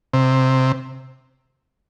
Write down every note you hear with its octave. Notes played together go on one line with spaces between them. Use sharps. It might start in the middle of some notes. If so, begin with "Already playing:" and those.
C3